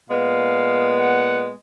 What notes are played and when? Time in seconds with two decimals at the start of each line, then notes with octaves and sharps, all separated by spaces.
0.10 A#2 G#3 B3 F5
0.99 F#5